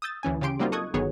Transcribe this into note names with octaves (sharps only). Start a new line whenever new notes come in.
D#6 E6 G6 A6
D2 E3 C#4 G#5
C#3 C#4 G4 C6 D7
F#3 G3 A#3 C4 D#4 F4
A4 D#5 C#6 D#6 F#6 G#6
G1 D#3 F#3 B3 G#4 C#5